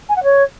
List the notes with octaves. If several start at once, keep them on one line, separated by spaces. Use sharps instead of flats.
G#5
F#5
C#5